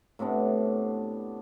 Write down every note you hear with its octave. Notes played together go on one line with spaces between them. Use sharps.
A2 C3 B3 D4